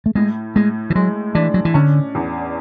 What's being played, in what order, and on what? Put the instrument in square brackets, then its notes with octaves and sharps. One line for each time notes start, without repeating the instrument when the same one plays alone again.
[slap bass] A3
[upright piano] A2 [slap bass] G#3
[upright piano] A2 [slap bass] G#3
[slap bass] E3
[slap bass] F#3 [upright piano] G#3
[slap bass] E3 [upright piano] D4
[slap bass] F#3
E3
[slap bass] D3 [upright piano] C#4
[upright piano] E2